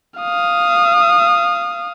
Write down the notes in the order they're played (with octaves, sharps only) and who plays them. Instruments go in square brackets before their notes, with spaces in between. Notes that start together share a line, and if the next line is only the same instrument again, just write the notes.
[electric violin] F5 D#6